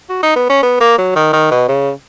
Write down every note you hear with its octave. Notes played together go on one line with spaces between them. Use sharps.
F#4
D#4
B3
C#4
B3
A#3
F#3
D#3
D#3
B2
C#3